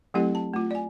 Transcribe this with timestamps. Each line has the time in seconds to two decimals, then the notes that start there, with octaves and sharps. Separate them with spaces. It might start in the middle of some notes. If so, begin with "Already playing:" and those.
0.14 F#3 A3 C4 E4 G4 A4
0.35 A5
0.54 A3 F4
0.71 D5 G#5